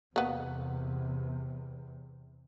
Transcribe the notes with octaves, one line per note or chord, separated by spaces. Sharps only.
E2 C3 A#3 B3